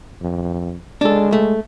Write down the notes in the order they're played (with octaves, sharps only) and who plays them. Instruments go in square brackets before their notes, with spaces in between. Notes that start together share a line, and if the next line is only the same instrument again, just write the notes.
[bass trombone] F2
[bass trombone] G#3 [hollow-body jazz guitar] D4 A4
[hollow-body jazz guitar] A3